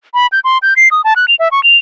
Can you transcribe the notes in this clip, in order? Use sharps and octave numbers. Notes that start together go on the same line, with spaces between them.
B5
G6
C6
G6
C7
D#6
A5
F#6
F7
E5
C#6
F7